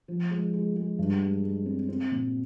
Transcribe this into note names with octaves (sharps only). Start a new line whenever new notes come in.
F3
G#3
G#3
G#3
G2
G#3
G#3
C4
C4
A#2